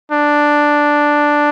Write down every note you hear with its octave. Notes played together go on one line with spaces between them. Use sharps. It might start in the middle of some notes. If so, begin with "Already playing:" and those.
D4